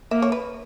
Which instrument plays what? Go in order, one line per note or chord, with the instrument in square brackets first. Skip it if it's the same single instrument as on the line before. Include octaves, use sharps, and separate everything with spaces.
[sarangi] A#3 [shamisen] E5
[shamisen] C#5
B4